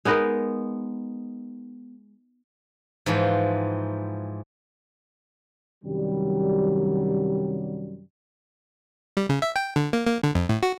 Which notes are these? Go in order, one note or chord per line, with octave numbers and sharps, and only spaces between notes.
G#3 B3 D#4 A#4
G#2 E3 F3 F#4
F#2 C3 D#3 F#3 G3
G3
C#3
E5
G5
D3
A#3
A#3
D3
F2
A2
F#4